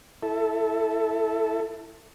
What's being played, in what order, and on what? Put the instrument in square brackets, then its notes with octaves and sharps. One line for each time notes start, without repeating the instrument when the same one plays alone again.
[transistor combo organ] E4 A4